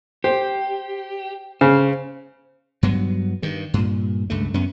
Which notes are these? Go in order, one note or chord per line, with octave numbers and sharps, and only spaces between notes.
G4 C5
C#3 C5
G2 F#3 B3
G2 D#3
G2 A#2
C#2 G2 A3
F#2 B3 C#4